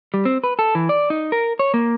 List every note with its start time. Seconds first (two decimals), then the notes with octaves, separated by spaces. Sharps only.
0.14 G3
0.25 C4
0.44 B4
0.59 A4
0.75 E3
0.89 D5
1.10 D#4
1.32 A#4
1.59 C#5
1.74 A#3